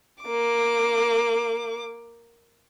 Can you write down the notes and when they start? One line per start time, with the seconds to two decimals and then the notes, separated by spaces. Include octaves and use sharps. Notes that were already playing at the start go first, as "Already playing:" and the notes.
0.24 A#3 D6